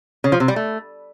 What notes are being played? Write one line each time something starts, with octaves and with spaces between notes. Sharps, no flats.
C#3
F3
C3
G3
A3